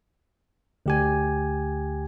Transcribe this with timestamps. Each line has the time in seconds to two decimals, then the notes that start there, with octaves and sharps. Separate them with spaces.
0.86 D2 G4 G#5